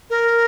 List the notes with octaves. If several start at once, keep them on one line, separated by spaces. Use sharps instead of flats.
A#4